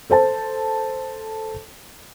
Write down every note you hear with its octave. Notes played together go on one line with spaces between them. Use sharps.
A4 C5 A5